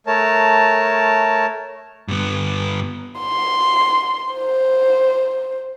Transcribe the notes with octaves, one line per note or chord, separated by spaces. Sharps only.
A3 A#4 C#5 A5
G2 B3
C6
C5